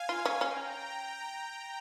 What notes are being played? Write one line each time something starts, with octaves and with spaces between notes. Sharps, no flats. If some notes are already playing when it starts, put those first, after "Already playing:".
Already playing: F5 G#5
F4
C#4
C#4 G5 A#5